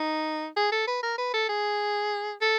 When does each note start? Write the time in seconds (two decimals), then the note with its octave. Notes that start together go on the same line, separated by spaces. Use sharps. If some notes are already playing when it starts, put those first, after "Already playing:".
Already playing: D#4
0.57 G#4
0.72 A4
0.87 B4
1.03 A#4
1.18 B4
1.34 A4
1.49 G#4
2.41 A4